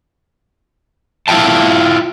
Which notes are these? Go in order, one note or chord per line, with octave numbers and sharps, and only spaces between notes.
E4 F4 F5 G5 A5